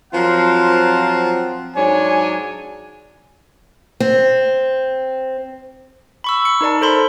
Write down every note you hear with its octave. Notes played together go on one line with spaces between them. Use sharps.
F3 F#3 C4 F4 A#4 F#5
G#2 F#3 D4 C#5 G#5
C4
B5 C#6 E6
C#7
D#4 A#4 D5 A5
A4 C5 B5 C6